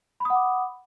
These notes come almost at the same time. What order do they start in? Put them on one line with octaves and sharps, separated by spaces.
B5 D#6 F#5 D6